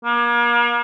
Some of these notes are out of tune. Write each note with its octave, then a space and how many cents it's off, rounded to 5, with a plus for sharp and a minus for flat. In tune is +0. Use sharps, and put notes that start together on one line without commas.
A#3 +40